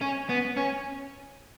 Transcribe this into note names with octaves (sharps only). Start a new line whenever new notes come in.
C#4
B3
C#4